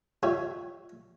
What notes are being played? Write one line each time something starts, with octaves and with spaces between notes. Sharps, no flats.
G3 F4 C#5 E5